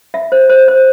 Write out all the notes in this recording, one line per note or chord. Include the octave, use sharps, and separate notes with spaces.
E5
C5
C5
C5